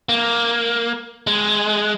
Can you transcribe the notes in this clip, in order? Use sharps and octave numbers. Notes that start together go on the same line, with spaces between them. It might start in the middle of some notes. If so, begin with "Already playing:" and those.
A#3
G#3